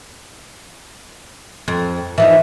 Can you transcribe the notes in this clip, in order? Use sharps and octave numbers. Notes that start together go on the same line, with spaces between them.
F2
E3 F3 D#4 E5